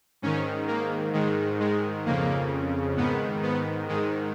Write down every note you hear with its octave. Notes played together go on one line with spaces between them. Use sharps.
G#2 D#3 C#4
A#3
G#2 D#3 G#3
G#3
F2 C#3 A#3
G#2 D#3 B3
B3
G#2 D#3 G#3